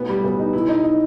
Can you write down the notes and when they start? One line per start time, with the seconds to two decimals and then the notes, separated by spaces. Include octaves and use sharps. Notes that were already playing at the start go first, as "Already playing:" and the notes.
Already playing: B1 A2 B3
0.09 G3
0.24 B1 B3
0.39 D#4
0.53 B1 E4
0.69 D#4
0.84 D#4